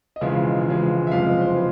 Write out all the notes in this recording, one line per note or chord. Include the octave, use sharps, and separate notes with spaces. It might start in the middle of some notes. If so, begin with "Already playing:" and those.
D#5
E1 E2 C#3 F3 G#3 E5
E1 E2 C#3 F3 G#3
E5
F#1 F2 C3 F3 G#3 F5
D#5
C5
G#3 B4